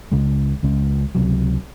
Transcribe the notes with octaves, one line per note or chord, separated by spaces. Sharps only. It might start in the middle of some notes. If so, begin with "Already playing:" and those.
C#2 C#3 G#3
C#2 C#3 G#3 C#4
C#2 C3 F#3